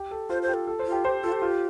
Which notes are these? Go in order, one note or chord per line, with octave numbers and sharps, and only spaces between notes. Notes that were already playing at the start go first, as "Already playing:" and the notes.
Already playing: G4
A4
F4 C5
A4 C5
G4
A4
A4
C5
F4
G4
G4 C5
F4 A4
G4
F4